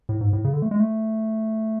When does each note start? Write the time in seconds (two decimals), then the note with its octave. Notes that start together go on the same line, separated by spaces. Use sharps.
0.09 A2
0.21 G#2
0.33 A2
0.44 C#3
0.53 D3
0.62 A3
0.71 G#3
0.80 A3